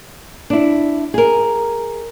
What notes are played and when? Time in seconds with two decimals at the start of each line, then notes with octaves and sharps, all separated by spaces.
0.50 D4 E4
1.14 G#4 A#4